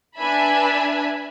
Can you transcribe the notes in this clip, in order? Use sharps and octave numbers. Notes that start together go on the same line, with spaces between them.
D4 B4 E5 G#5 A5 B5